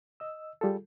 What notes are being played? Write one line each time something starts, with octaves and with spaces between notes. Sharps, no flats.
D#5 E6
G3 F4 G#4 A4